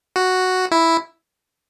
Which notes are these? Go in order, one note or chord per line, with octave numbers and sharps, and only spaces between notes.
F#4
E4